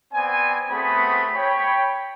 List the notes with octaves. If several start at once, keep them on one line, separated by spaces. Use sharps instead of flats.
B3 C4 D5 G#5
A3 B3 C4 F#4 G#4 B5
C#5 G5 B5